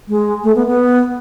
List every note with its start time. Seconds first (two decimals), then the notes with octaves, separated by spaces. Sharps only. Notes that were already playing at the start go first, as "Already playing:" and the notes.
0.08 G#3
0.43 A3
0.55 B3
0.66 B3